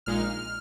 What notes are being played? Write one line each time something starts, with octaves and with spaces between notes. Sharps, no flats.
A#1 A#2 G#3 D#4 F6